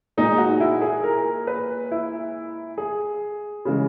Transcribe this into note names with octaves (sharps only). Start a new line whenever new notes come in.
A#2 G#3 D#4
F#4
E4
G#4
A#4
B4
E4
G#4
C#3 E3 G#3